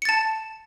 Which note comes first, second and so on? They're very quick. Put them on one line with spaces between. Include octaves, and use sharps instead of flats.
C#7 A6 A5